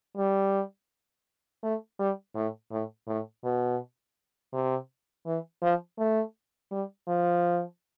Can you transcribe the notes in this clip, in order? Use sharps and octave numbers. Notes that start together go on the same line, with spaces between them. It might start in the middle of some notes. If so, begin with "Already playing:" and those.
G3
A3
G3
A2
A2
A2
B2
C3
E3
F3
A3
G3
F3